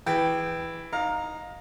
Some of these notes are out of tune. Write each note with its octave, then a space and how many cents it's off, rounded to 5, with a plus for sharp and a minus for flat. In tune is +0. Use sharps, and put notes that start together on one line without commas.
E3 +0 G#4 -30 G5 +0
D#4 +0 F5 +25 A#5 +0